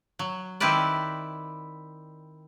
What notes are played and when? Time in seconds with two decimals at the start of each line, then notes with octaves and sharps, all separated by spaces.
0.19 F#3
0.60 D#3 C4 E4 G4 B4 D5